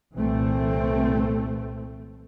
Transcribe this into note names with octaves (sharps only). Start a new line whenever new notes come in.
C2 A#2 E3 A3 C4